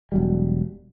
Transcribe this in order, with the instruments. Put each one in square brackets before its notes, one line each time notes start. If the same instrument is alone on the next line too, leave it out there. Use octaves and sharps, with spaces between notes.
[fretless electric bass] E1 F#3 G3